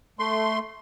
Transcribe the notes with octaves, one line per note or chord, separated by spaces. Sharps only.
A3 C6